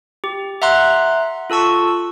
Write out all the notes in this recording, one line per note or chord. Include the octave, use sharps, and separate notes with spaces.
G4
E5 F#5 A#5 C6 F#6
F4 A4 A5 C#6 E6